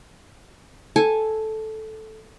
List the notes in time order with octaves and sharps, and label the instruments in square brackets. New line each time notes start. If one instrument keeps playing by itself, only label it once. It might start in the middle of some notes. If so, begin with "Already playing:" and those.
[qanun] A4 G#5